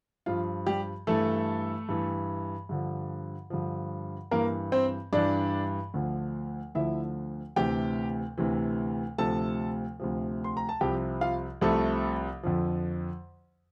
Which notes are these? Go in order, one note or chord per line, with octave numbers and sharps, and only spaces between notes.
G2 F3 F4
G3 G4
G2 E3 A3 A4
G2 E3
G2 D3 F3
G2 D3 F3
G2 E3 A#3 A#4
C4 C5
G2 E3 D4 D5
D2 D3 F3
D2 D3 F3 E4 E5
D2 C3 E3 G4 G5
D2 C3 E3
D2 C3 F3 A4 A5
D2 C3 F3
C6
A#5
A5
C2 C3 F3 G4 G5
F4 F5
C2 C3 F3 A3 A4
F2 D3 F3